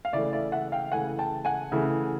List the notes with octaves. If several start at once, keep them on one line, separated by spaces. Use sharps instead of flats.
F5
C#3 E3 A3 D5 E5
D5 E5
E5 F#5
F5 G5
C#3 E3 A3 F#5 G#5
G5 A5
F#5 G#5
C#3 E3 A3